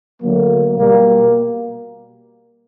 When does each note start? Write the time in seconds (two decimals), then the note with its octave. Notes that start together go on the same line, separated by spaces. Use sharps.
0.23 D3 F#3 A3 A#3
0.76 B2 G3 A#3